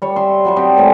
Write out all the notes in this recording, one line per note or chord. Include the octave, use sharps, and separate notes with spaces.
G3 C#5
E5 C6
F#3 G3 C#6
C4 D4 D#4 G4
A2 C3 G#3